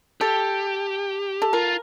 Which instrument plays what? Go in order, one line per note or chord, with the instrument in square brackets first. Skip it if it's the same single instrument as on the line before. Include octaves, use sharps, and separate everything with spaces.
[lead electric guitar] G4 [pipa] A4
[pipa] A4
[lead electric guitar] F4 [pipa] A#4